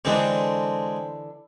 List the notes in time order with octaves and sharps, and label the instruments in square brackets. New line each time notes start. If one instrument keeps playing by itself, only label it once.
[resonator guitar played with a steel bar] D3 E3 D4 [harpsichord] G#3 C4